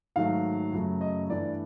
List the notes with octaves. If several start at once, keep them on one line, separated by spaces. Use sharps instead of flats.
G#2 D#3 F#3 A3 F5
F#2 C#3 F#3 A3
D#5
G2 E3 A3 D5